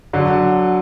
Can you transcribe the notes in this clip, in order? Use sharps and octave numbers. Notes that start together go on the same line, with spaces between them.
D3 F#3